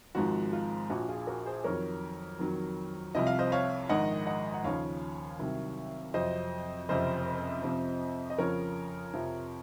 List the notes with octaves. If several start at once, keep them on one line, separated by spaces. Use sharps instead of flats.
G#1 G#2 F3 F#4
F4
A#1 A#2 F3 F#4
F4 G#4
F#4 A#4
G#4 C5
F2 D#3 F#3 A#4 C#5
F2 D#3 F#3
C2 C3 F3 D#5
F5
C5 D#5
C#5 F5
A#1 G#2 D#3 D#5 F#5
D#5 F#5
F#5
D#2 C#3 F3 C#5 F5
C2 C3 D#3 F#3
F2 C3 F#3 C5 D#5
F#1 F2 C3 C5 D#5
F2 C3 F3
D#5
F2 C#3 F3 A#4 C#5
F2 C3 F3